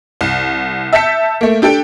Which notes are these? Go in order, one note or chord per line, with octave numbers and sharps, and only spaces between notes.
C2
E5 A5 G6 B6 C#7
A3 A#3
D4 G4 A4 G5